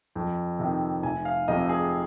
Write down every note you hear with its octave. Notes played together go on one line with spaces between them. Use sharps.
F2
C3 D#3
F1 G#5
F5
F2 C3 D#5
G#4